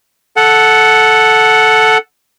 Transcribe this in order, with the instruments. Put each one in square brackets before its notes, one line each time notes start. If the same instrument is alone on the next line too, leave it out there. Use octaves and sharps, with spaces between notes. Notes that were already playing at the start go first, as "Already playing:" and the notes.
[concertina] A4 F#5